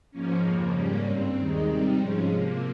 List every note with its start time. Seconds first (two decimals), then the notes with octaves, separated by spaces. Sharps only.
0.11 G#2 F3 A#3 C#4
0.42 F2 C#3 F3 A#3
0.73 G#2 G3 A#3 C#4
1.04 G2 G3 C4
1.35 D#2 D#3 G#3 D#4
1.66 C3 G3 C4 D#4
1.97 G#2 F3 G#3 C#4
2.28 C3 F3 A#3